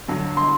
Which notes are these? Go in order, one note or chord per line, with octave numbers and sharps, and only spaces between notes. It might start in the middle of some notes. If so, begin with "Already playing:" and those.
G2 D3 F#3
C6